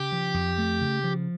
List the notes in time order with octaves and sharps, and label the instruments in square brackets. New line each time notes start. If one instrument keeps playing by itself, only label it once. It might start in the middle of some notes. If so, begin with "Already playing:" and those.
Already playing: [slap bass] C#3 [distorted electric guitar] G4
[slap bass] F3
F2
A3
C#3
F3